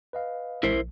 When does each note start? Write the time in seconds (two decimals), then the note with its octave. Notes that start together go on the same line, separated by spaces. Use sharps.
0.13 B4 D#5 F5
0.63 A1 G#3 E4 A#4 C5 B6
0.74 A#1